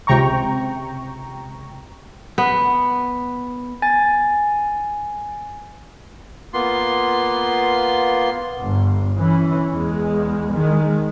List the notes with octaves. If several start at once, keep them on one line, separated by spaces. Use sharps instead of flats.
C#2 C3 G5 A#5 C#6
B3
G#5 A6
A#3 B3 F4 C6
G1
E3 C#4
E2 G#3
D#3 G#3